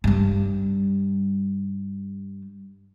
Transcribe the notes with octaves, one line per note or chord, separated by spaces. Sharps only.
G2 G3